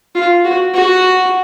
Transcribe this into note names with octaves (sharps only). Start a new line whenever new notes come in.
F4
F#4
F#4